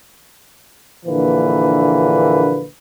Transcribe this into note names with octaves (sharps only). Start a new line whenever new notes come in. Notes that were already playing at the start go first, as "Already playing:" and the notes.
A#1 D3 E3 A#3 B4